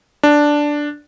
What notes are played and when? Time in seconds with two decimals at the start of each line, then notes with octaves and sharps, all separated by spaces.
0.23 D4